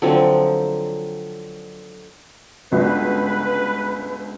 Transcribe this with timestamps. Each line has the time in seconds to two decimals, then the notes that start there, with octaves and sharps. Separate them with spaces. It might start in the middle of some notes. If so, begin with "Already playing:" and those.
0.02 D3 F3 F#3 C4
2.72 G1 C#2 F#4 B4